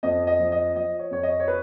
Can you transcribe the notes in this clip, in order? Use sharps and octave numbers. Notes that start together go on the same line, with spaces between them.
F2 D#5
D#5
F3
D#5
F3 D#5
C#5
F2 C#5
D#5
C#5
B4